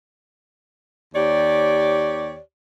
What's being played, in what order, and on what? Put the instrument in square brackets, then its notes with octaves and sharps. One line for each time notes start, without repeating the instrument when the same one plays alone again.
[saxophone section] D#2 G4 C#5 D5